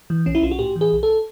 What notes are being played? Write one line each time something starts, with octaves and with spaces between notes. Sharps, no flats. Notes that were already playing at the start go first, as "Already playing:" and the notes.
E3
B1 C#4
E4
B1 F4
F#4
A2 G4
E3
G#4
B1
A4